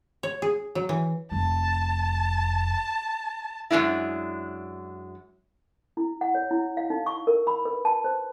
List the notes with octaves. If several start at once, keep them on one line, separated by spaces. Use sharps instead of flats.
C#5
G#4
F#3
E3
F1 F2 A5
F#2 C#3 G#3 D4 E4
E4
F#5
C#5
E4
F5
D#4
C#6
A#4
B5
B4
A5
C5